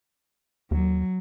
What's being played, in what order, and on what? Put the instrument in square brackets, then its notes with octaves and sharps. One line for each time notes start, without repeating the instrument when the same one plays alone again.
[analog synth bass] D#2 [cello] F#3